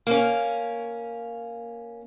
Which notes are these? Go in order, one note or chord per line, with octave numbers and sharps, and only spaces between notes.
A#3 C#4